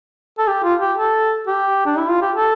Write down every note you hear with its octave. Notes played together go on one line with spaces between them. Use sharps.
A4
G4
F4
G4
A4
G4
D4
E4
F4
G4
A4